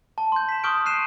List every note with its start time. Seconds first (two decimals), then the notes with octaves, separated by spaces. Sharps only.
0.18 A5
0.32 C6 G6
0.49 B6 E7
0.64 C6 C#6 D#6 F6 G6 D7
0.85 C6 F#6 C7 D#7 E7